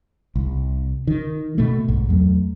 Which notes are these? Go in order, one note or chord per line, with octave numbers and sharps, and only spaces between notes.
C2
D#3
B2 A3
B1 G#2
E2 F#3 A3